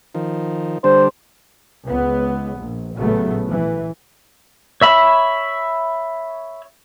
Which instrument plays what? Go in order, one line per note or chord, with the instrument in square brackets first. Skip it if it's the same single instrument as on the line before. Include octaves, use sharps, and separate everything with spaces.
[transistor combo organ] D#3 F3
[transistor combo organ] D3 G3 D4 [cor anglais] C5
[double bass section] C#2 B3
A#1
A1 A#2 C#3 F#3 A3 B3
E3
[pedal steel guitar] C#5 E5 B5